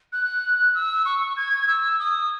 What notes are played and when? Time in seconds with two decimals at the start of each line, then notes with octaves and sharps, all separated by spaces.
0.12 F#6
0.75 E6
1.05 C#6
1.37 G#6
1.68 E6
1.99 D#6